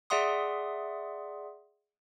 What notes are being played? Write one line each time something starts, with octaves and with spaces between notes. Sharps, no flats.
G#4 D5 E5 F#5 C6 D#6